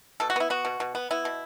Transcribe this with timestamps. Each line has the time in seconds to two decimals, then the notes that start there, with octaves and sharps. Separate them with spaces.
0.20 B2 A4
0.30 F#4
0.36 B3 E4
0.50 B3 F#4
0.65 B2
0.80 B2
0.95 B3
1.11 B3 E4
1.25 B2